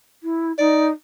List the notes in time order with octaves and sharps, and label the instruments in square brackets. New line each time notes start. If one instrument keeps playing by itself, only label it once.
[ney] E4
[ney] D#4 [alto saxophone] D5